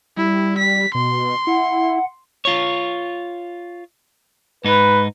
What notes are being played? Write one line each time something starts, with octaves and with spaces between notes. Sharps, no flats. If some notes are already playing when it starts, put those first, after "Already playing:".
G3 E4
B6
B2 C6
E4 F#5
F4 C#5
G#2 D#4 B4